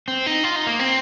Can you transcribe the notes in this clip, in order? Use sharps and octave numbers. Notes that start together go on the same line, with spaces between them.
C4
D#4
F4
D#4
A#3
C4